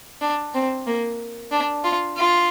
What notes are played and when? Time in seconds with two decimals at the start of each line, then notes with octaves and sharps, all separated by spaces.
0.21 D4
0.55 C4
0.87 A#3
1.52 D4
1.85 F4
2.17 F4